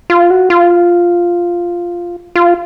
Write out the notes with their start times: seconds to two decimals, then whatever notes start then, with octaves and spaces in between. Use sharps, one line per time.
0.10 F4
0.31 F#4
0.50 F4
2.35 F4